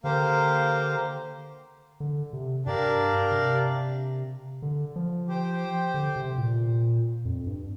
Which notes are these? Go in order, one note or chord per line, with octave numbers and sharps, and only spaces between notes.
D3 A#3 G4 C5 F5
D3
C3
G2 D4 G4 A#4 D5 F5
C3
D3
F3
G4 C5 G5
D3
C3
A#2
F2
G2